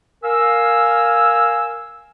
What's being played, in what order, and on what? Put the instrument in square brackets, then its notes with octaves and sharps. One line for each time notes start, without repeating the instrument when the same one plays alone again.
[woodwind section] A#4 F5 G#5 E6